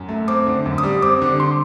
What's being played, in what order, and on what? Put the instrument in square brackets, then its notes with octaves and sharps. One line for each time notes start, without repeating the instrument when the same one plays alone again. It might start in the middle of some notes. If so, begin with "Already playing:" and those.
Already playing: [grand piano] F#2
A3
[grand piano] C4 [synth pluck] D6
[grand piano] D3
F#2
[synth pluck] D#6
[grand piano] G3
[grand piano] C4 [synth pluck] D6
[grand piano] D3
[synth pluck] C6